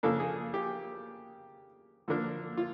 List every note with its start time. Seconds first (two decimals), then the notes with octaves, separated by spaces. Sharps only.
0.03 C#3 F3 A#3 D4 A4
0.20 G#4
0.54 G4
2.08 D3 F3 A#3 D4
2.57 F4